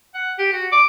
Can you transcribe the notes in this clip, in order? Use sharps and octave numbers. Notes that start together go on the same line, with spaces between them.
F#5
G4
F#4
D6